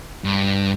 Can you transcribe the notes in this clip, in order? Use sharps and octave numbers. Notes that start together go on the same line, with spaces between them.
G2